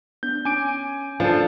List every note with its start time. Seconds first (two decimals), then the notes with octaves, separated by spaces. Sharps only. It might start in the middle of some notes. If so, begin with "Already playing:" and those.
0.23 B3 D4 G6
0.45 C#4 G#5 D6 D7
1.20 F3 D4 A4